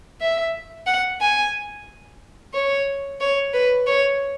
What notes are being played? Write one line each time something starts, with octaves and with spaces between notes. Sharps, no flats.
E5
F#5
G#5
C#5
C#5
B4
C#5